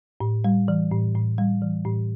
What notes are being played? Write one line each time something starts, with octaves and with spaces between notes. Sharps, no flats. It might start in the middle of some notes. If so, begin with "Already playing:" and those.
A2
G3
E3
A2
A2
G3
E3
A2